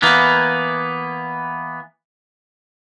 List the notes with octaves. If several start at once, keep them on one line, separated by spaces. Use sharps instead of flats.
E3 A#3 B3